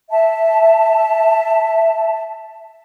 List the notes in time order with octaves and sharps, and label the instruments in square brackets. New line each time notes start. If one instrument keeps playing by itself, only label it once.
[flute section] E5 A5